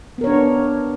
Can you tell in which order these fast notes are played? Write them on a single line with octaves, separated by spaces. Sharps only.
B3 A#4 C#5 D4